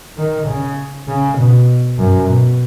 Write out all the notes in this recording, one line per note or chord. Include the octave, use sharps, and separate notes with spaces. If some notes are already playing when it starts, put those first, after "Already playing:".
D#3
C#3
C#3
B2
F#2
B2